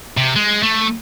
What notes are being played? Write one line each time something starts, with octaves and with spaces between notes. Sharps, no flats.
C3
G#3
A3